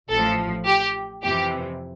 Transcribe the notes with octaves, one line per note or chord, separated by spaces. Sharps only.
A1 A2 F3 A4
G4
F2 C3 E3 G4